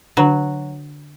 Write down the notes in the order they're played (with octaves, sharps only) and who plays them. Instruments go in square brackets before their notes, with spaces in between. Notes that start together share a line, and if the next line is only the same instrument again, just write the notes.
[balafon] D3 D4 [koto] F#3